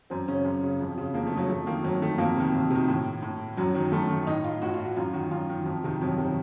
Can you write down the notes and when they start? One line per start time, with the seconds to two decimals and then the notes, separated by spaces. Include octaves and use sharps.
0.10 F#2 C4
0.28 C#3 C#4
0.45 F#2
0.63 C#3
0.81 F2
0.98 C#3
1.14 F2 A#3
1.27 A3
1.32 C#3
1.37 F#3
1.49 F2 A3
1.66 D#3 A#3
1.84 F2 F#3
2.02 D#3 A3
2.18 F2 A#3
2.36 C3 D#3
2.54 F2
2.70 C3 D#3
2.88 A2
3.22 A2
3.57 F#2 F#3
3.74 D#3 F#3
3.92 F#2 A3
4.09 D#3
4.27 A2 D#4
4.44 F4
4.62 A2 F#4
4.74 F4
4.85 F#4
4.97 F#2 F4
5.13 D#3 F#4
5.31 F#2 F4
5.49 D#3
5.66 F2
5.84 C3 D#3
6.01 F2 F#3
6.18 C3 D#3 F#3